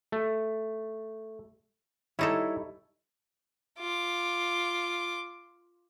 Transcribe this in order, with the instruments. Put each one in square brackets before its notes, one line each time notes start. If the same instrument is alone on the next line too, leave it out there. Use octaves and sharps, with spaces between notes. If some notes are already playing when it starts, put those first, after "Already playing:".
[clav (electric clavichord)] A3
[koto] G3 D#4 A4 [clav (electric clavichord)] E4 C#5
[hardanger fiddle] F4 D6